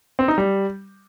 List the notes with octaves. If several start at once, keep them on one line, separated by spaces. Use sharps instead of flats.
C4
D#4
G3